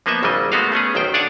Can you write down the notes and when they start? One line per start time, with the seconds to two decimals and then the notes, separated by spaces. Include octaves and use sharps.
0.06 F3 A#3 B3 D#5 E5
0.23 G#1 C#3 F#3 G3 D#5
0.52 G#3 A3 B3 F#4 D#5 F5
0.72 A3 B3 C#4 G#4
0.95 B1 D#3 C5 G5
1.14 D4 D5 F5 F#5 G#5 A5